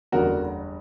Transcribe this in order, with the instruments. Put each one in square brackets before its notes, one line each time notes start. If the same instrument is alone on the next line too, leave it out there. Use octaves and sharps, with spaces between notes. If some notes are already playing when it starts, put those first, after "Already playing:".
[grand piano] F#1 E2 D3 G3 F#4 A#4